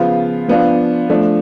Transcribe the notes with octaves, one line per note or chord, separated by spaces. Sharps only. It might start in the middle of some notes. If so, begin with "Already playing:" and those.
Already playing: C#3 F3 B3 F4
F3 B3 D4 F4
F3 A3 D4